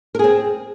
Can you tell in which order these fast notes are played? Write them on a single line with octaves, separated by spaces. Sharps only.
A#4 G#4 C4